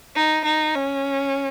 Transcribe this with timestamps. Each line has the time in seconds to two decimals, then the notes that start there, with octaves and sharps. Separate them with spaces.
0.15 D#4
0.45 D#4
0.75 C#4